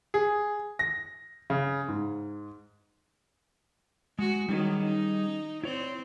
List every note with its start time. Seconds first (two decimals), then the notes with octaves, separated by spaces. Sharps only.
0.14 G#4
0.79 A#6
1.50 C#3
1.88 G#2
4.19 G#3 F#4
4.49 D#3 F#3 G3 C#4 G#4
4.84 D#4
5.64 C4 E4 C#5 D5